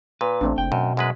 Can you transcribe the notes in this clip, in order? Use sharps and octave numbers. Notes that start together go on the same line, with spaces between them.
A#2 B4
A1 A3 C4 D4
F#1 G5
F#2 B2
F#2 G#3 B4